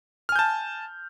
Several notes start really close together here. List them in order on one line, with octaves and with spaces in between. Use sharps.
F6 G#5 G6 A5